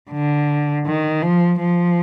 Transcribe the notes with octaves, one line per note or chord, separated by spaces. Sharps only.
D3
D#3
F3
F3